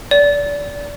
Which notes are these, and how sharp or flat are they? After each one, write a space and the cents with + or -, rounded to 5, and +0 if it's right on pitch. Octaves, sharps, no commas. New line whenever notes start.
D5 -25